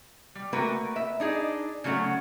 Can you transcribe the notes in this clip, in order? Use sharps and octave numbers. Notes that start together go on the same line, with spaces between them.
G3
A3 A#3 F#4 A#4 B4 G5
E5
D4 D#4 G#4
C#3 F#3 A3 C#4 F#5